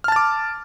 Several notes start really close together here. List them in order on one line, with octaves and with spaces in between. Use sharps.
F6 A5 A6 D6